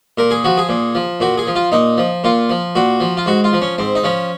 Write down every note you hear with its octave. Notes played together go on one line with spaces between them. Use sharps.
A#2 A#4
G#4
F3 F#4
G#4
A#2
F3
A#2 F#4
G#4
F3
F4
A#2 D#4
F3
A#2 F4
F3
A#2 F#4
F3
F4
G#2 F#4
F4
F3
C#4
G#2 C4
D#4
F3 C#4